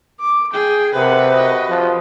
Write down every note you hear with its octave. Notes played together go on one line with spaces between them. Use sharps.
D6
G#4 G5
C3 A#4 B4 F#5
F#4 D#5
F3